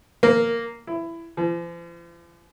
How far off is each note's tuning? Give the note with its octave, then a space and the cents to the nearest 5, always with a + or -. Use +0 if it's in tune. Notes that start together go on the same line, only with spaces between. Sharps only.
A#3 -5
E4 +15
F3 -45